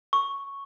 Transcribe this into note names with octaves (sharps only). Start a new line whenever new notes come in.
C#6